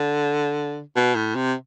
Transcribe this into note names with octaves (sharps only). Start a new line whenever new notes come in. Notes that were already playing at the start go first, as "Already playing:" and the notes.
Already playing: D3
B2
A2
C3